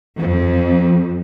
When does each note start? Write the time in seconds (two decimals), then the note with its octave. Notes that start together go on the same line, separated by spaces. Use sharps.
0.19 F2